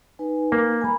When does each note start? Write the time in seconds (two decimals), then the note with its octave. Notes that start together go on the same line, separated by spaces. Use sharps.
0.19 D#4 B4 G#5
0.52 A#3
0.81 G#5 A#5 B5